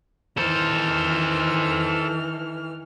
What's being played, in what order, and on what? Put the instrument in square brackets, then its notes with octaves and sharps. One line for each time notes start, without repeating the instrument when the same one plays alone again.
[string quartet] D#3 E3 F6 [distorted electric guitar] A4 C5